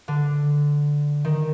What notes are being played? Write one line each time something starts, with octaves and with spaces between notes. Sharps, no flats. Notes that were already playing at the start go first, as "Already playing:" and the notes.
D3
D#3